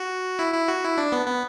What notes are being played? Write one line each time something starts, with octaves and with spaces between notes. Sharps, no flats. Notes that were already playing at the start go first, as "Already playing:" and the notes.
Already playing: F#4
E4
E4
F#4
E4
D4
B3
B3